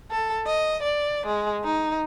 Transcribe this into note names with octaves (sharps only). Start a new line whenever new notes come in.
A4
D#5
D5
G#3
D#4